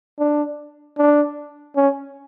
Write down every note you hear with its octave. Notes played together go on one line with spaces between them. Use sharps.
D4
D4
C#4